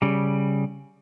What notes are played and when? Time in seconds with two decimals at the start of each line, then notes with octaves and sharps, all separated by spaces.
0.02 C#3 G3